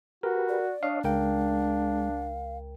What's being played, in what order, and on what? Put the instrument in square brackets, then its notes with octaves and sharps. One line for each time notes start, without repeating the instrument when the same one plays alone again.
[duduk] F#4 [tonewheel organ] G4 B4 [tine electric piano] A#4
[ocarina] D5
[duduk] D4 [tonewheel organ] C#5 D#5 [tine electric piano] F5
[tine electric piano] C#2 A#4 G5 [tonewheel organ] G#3 [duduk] D4 [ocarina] F5